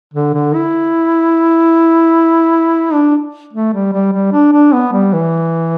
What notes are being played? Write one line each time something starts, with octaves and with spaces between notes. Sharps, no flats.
D3
D3
E4
D4
A3
G3
G3
G3
D4
D4
B3
G3
E3